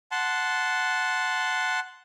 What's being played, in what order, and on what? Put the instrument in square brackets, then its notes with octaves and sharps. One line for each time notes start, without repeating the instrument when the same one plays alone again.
[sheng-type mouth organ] F#5 A5 C6